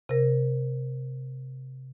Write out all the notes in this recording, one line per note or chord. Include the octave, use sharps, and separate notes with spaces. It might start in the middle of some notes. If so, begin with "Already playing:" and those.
C3 A#4